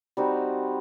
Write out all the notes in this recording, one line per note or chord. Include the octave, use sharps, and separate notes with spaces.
G3 C4 D#4 F#4